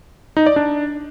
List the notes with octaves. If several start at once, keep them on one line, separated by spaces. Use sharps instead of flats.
D#4
D5
D4